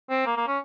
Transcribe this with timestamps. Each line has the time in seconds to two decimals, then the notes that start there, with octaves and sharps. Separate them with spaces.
0.10 C4
0.26 A#3
0.37 A#3
0.47 C#4